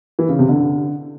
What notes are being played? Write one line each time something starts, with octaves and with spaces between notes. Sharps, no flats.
E3
C#3
C3
D3